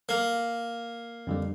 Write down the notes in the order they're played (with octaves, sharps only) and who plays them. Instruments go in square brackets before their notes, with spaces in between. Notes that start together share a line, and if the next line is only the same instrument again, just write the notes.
[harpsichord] A#3
[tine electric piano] F2 D3 G3